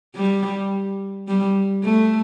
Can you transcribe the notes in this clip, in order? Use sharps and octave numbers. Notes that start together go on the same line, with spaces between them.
G3
G3
A3